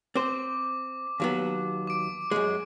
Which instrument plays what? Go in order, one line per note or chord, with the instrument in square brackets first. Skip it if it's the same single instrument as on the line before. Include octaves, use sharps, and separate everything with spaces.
[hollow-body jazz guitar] C4 C5 [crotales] D6
[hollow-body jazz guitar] D#2 F#3 B3
[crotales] D6 D7
[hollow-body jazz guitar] F#2 G#3